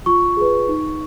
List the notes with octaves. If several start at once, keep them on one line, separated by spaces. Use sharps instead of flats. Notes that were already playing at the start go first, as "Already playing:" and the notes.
F4 C#6
G#4 B4
D#4